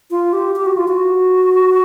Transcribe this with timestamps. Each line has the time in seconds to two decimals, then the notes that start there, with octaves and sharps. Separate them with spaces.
0.10 F4
0.33 G4
0.56 G4
0.66 F#4
0.77 F4
0.88 F#4